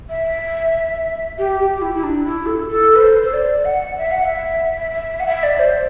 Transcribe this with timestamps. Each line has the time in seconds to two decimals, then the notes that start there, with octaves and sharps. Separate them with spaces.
0.09 E5
1.38 G4
1.60 G4
1.82 E4
1.94 E4
2.03 D4
2.24 E4
2.46 A4
2.68 A4
2.95 B4
3.00 C5
3.22 C5
3.33 D5
3.65 F#5
3.97 E5
4.11 F#5
4.25 E5
5.20 F#5
5.26 E5
5.43 D5
5.59 C5